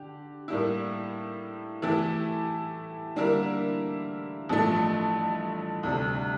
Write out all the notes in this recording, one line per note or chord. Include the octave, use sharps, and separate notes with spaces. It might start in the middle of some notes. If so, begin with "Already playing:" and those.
Already playing: D3 G4
A2 G3 A#3 E4
E3 A3 E4 G4
D3 G3 A#3 E4 A#4
A1 G2 F3 A3
D2 C3 G3